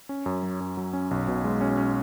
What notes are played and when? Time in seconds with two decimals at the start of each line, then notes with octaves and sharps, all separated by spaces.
0.09 C#4
0.26 F#2
0.43 F#3
0.60 F#2
0.77 F#3
0.93 C#4
1.11 B1
1.28 B2
1.44 G#3
1.61 C#4
1.77 C#4